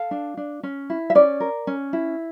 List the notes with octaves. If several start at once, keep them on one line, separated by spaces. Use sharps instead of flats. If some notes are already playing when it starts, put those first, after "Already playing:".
Already playing: A4 F5
D4
D4
C#4
E4
E5
C#4 D5
A#4
C#4
E4